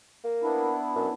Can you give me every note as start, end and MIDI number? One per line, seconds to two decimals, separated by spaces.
0.24 0.73 58
0.43 1.13 59
0.43 1.13 62
0.43 1.13 64
0.96 1.08 42